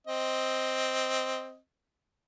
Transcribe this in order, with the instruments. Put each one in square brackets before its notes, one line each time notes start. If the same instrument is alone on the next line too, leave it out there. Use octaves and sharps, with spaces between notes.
[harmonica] C4 D#5